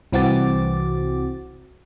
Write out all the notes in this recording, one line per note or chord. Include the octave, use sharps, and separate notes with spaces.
C2 E3 C4 F#4 D6 A6